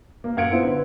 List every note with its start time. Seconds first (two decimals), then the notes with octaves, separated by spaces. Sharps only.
0.24 A#3
0.37 F#2 F5 F#5 G#6 C#7 D7
0.50 B3 C4 E4 F4
0.63 D3 B4